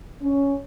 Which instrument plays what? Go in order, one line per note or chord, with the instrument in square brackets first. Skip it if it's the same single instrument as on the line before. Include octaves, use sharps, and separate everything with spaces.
[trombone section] C#4